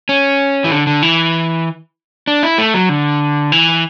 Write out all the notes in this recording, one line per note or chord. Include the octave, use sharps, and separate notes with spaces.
C#4
E3
D3
D3
E3
D4
E4
A3
F#3
D3
E3